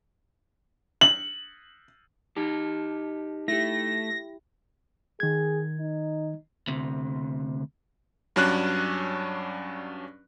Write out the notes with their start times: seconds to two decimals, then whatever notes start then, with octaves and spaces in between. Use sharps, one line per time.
1.01 F#7
2.37 D#4 G4 D#5 A5
3.48 A3 E4 G4 A#6
5.20 D#3 G#4 G#6
5.78 D#4
6.67 D2 C3
8.36 G2 F#3 C#4 D4 F#6